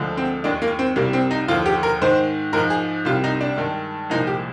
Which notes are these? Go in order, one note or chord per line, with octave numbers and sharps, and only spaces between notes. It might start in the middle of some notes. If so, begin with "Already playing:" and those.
Already playing: D2 D3 F3 G#3
C4
D#2 D#3 G#3 D4
A#3
C4
C2 C3 G3 A#3
C4
D#4
D#2 D3 F3 F4
G4
A#4
G#2 D#3 G#3 C5
G#2 F3 G#3 A#4
G#4
C2 C3 G3 F4
D#4
D4
G2 D#3 G#3
C2 A#2 F3 G#3 D#4
G4